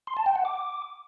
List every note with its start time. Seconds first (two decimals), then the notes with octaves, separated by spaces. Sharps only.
0.07 C6
0.17 A5
0.26 G5
0.36 F#5
0.45 D6